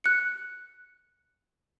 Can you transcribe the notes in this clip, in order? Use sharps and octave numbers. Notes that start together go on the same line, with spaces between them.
F#6 C#7